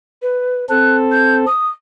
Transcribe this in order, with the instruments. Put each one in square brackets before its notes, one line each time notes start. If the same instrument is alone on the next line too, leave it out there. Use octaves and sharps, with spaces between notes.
[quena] B4
[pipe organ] C4 A4 [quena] F#6
[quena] G6
D#6